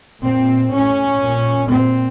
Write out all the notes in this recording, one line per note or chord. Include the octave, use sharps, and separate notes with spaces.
A#2 C4
A2 C#4
A#2
A#2 C4